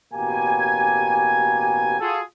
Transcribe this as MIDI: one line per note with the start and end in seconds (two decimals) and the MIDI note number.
0.13 1.97 33
0.13 1.97 47
0.13 1.97 58
0.13 1.97 67
0.13 1.97 80
2.00 2.20 65
2.00 2.20 66
2.00 2.20 68
2.00 2.20 69